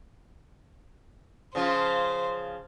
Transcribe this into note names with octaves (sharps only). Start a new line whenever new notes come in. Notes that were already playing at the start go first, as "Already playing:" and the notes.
C#3 F3 F4 C5